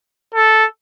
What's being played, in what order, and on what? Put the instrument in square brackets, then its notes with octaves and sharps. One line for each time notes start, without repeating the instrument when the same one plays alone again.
[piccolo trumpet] A4